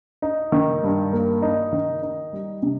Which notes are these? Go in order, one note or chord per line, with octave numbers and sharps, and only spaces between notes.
D#4
D#3
G2
A#3
D#4
D#3
D#4
G3
C3